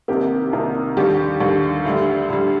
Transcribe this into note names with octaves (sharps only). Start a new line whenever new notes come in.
C2 C3 D#3 A#3 G4
C2 C3 D#3 A#3
D#2 D3 G3 G4
D#2 D3 G3
D2 D3 G3
D2 D3 G3